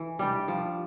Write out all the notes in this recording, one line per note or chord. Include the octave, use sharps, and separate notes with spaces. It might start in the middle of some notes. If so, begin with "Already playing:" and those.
Already playing: E3
G3 D4 G4
F3